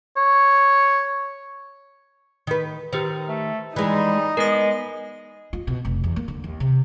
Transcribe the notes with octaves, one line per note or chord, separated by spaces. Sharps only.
C#5
D#3 B4
D#3 G4 B4 C5
A3
E3 G3 G#3 D#4 D#5
G#3 B3 A#4 D#6
F4
B2
F1
E2
A#3
D3
D#2
C3